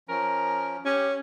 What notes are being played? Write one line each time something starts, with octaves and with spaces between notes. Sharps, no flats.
F3 C#4 A#4
C#4 G4